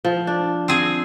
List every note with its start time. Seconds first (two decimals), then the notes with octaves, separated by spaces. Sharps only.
0.05 F3
0.27 D4
0.68 C4 G#4